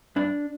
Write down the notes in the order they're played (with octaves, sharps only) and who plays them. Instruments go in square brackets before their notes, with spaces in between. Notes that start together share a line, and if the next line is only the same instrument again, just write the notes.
[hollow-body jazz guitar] G2 D4